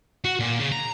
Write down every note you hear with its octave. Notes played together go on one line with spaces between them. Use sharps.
F#4
A#2
C#3
A#5